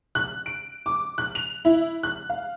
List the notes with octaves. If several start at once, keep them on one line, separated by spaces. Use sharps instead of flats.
F#6
D7
D6
F#6
F7
E4
F#6
F5